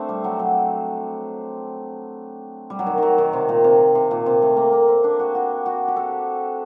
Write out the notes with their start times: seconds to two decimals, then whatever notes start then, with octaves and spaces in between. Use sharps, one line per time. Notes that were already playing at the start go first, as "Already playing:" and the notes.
Already playing: A3 C4 D4
0.09 G3
0.24 F#3
0.39 F#3
2.70 G3
2.79 F#3
2.87 D#3
2.98 D#3 F#3
3.18 D#3
3.33 C3
3.49 A#2
3.64 C3
3.95 C3
4.11 A#2
4.26 C3
4.42 A3
4.57 A#3
4.73 A#3
4.88 C4
5.04 D4
5.19 F#4
5.35 F#4
5.66 F#4
5.88 G4
5.96 A4